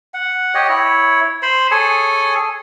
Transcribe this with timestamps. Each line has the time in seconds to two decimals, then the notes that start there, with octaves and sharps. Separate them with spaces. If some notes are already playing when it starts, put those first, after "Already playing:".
0.14 F#5
0.55 G4 C#5 D#5
0.69 E4 C#5
1.42 C5 B5 C6
1.71 G#4 A4 C#5 G#5